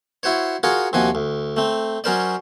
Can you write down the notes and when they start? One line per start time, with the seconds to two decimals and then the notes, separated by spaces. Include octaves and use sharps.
0.23 E4 F#4 C5 C#5
0.63 F4 F#4 G#4 A#4 C#5
0.93 D#2 C3 F3 F#4 G#5
1.15 D2
1.57 A3 C4
2.04 F#3 C#4 A#4 C5 D5